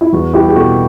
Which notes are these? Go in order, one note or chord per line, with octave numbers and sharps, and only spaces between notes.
E4
E2 F#4
G3 E4 G4
G4
B2 F#4 A4